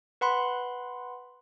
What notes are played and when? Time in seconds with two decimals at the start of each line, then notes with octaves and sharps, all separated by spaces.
0.21 B4 F#5 B5 C6